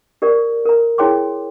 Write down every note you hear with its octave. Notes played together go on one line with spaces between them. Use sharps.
G4 A#4 D5
A#4 A#5
E4 G#4 C#5 G5 C6 D6